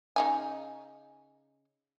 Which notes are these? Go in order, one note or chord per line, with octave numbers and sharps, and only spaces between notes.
C#3 D#4 G#5